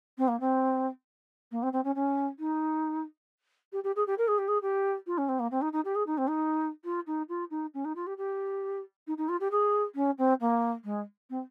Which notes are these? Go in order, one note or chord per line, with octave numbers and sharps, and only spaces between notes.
C4
A#3
C4
A#3
C4
C4
C#4
C#4
D#4
G4
G4
G#4
G4
A#4
G#4
G4
G#4
G4
F4
C#4
C4
A#3
C4
D#4
D#4
G4
G#4
D#4
C4
D#4
F4
D#4
F4
D#4
C#4
D#4
F4
G4
G4
D#4
D#4
F4
G4
G#4
C#4
C4
A#3
G#3
C4